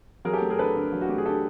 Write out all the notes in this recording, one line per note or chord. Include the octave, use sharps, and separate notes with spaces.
F#3 G#4 A#4
G4 A4
A3
G#4 A#4
D3 A4 B4
D3
F#3
F#4
A3 G4
G#4
D3 G4 A4